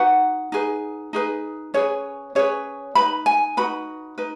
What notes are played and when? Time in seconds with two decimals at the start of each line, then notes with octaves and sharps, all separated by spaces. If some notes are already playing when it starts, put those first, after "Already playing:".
Already playing: D#4 F#4 B4 F#5
0.52 D#4 G#4 B4
1.13 D#4 G#4 B4
1.74 C#4 G#4 B4 C#5
2.35 C#4 G#4 B4 C#5
2.95 D#4 B4 B5
3.26 G#5
3.57 D#4 F#4 B4 B5
4.18 D#4 B4